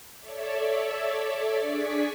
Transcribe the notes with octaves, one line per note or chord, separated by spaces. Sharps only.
A4 C#5 D5 E5
D4 G#4 D5 G#5 C#6 B6